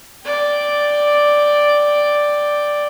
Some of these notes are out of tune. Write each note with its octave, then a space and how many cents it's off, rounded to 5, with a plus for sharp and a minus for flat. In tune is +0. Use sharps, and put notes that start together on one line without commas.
D5 +0 G5 +0